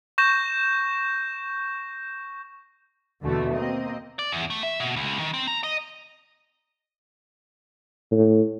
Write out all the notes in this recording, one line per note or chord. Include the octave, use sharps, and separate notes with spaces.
C#6 G6 A#6 E7
D#2 B2 D3 E3 A3
A#3 C4 D#5
D5
E2
A3
E5
B2
C#2
D#3
C4
A#5
D#5
A2